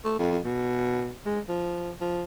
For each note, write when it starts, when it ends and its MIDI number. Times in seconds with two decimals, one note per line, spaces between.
0.05 0.15 57
0.19 0.39 41
0.45 1.14 47
1.26 1.40 56
1.48 1.92 53
2.01 2.24 53